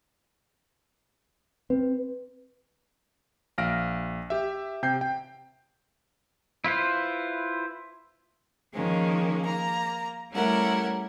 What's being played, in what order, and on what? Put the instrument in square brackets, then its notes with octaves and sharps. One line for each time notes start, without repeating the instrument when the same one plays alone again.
[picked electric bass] C4 [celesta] B4
[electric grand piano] A#1 F5 F6 A#6 D7
G4 E5
C3 G5 G6 C7
G5
[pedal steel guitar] E4 F4 B4 C5
[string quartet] D#3 F3 G#3 A#3 C#4
A#3 A#5
G3 A3 C#4 E4 A#4 F#5